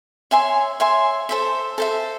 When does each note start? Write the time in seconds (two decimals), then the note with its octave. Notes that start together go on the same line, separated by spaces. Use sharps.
0.31 C#5 E5 G#5 C6
0.80 C#5 E5 G#5 C6
1.29 A4 C5 E5
1.78 A4 C5 E5